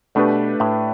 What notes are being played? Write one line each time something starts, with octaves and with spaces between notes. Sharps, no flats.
B2 A3 D4 G4 B4
A2